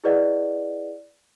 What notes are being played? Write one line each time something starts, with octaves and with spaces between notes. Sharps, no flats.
E4 G#4 B4 D5 D#5 F#5